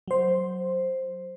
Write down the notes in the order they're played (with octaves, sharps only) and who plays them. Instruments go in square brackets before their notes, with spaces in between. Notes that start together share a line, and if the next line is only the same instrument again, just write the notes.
[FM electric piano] F#3 C5